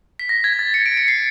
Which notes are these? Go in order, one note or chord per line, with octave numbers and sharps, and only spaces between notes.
B6
A#6
G#6
A6
C#7
D7
C#7
C7